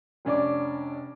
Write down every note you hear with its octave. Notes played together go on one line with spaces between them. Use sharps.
F1 C#4 D4 D5 D6